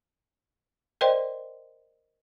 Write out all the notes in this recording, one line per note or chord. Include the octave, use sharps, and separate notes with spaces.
A#4 C5 D5 D#5 G5 C6